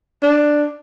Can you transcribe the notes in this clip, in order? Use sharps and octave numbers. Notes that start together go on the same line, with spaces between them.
D4